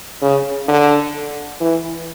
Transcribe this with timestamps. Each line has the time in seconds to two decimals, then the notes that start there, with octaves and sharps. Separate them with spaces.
0.22 C#3
0.68 D3
1.61 E3